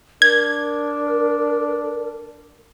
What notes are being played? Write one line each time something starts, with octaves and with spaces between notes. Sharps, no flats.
D4 A#4 G#6